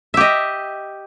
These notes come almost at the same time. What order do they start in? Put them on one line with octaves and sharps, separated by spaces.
E5 G4 D#5